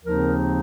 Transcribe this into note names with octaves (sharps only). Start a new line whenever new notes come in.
D#2 C#3 F3 C4 D#4 A#4